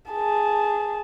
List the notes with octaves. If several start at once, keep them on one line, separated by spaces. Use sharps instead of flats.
G#4 A5